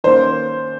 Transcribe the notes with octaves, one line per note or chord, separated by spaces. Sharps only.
D#3 A#3 C#4 C5